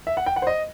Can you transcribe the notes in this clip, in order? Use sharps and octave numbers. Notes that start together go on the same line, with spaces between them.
E5
F#5
G5
F#5
C5
D#5